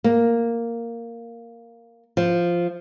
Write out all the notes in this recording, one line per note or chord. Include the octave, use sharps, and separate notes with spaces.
A#3
F3